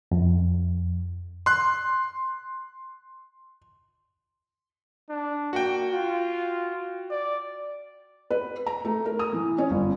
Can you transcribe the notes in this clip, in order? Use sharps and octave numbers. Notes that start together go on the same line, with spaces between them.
F2
C6 F#6
D4
A#3 F#4 G5
F4
D5
B4
A#5
A3
A#4
D#6
E3
C#4
G1